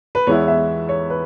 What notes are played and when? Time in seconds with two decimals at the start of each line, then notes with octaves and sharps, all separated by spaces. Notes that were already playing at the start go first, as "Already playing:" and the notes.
0.15 B4
0.27 E2 E3 G#3 B3 E4 C#5
0.48 E5
0.89 C#5
1.10 B4